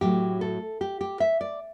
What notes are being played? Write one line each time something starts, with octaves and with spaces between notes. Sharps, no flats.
A2 F#3 A3 G4
A4
G4
G4
E5
D5